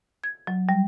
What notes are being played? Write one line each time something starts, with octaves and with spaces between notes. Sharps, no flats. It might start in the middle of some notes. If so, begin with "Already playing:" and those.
G#6
F#3
G3